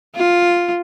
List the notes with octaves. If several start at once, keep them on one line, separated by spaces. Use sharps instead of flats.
F4